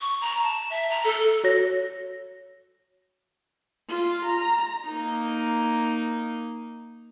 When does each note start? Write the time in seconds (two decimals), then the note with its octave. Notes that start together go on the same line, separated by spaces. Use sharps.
0.01 C#6
0.21 A#5
0.43 A5
0.70 E5
0.90 A#5
1.04 A4
1.44 F#4 C#5 A#6
3.88 F4
4.25 A#5
4.88 A#3 D#4